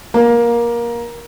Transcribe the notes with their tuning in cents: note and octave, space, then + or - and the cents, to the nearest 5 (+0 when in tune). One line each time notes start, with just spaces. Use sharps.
A#3 +20